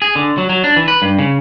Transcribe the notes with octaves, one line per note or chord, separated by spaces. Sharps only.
G#4
D3
F#3
F#3
D4
E3
B4
G2
C#3